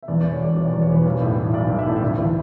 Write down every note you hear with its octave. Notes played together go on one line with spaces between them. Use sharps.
E5
E2 D5
E1 D5
C#5
E1 D5
E1 D5
E2 D5
C#5
E2 B4
B1
A2
E3
B1 D5
B1
E5
A2
E5
D2 D5
E3